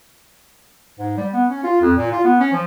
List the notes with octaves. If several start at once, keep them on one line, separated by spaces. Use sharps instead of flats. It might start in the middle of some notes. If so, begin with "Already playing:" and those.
G#2
G3
B3
C#4
F4
F2
A#2
F4
B3
C#4
F3